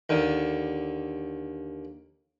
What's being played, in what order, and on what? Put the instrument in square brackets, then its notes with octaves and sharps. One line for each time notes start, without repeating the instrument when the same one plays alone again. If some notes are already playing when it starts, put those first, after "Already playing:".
[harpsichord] D#2 D3